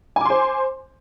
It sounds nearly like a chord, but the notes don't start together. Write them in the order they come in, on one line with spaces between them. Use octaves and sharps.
G#5 D6 C6 C5